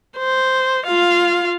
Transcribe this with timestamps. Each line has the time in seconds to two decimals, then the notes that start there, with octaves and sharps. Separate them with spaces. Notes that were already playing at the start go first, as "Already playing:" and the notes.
0.18 C5
0.86 F4 F5